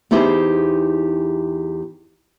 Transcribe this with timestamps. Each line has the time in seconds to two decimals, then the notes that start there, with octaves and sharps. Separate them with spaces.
0.11 E2 D#4 E4 G4 G#4 C5